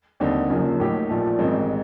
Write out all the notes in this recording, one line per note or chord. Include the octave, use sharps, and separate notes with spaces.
D#2 D3 G3 C4 D#4
F#1 F#2 C#3 F3 A#3
A2 F#3 A#3 D#4 G4
A#1 A#2 F3 A3
A1 G#2 D#3 G#3 C4